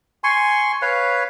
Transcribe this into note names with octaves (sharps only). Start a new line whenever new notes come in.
G#5 C6 C#6
B4 C#5 F5